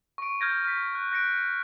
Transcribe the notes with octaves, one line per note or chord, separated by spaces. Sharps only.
C#6 D7
F6 G6 G#6 A#6 D7
F6 B6
F#6
F#6 A#6 C#7 D7